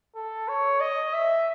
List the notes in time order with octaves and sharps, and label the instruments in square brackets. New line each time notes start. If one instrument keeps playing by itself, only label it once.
[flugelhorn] A4
C#5
D#5
E5